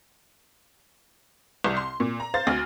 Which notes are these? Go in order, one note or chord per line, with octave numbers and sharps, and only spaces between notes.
C2 C3
C6
A#2
A#5
C5 F5 A6
D2 F6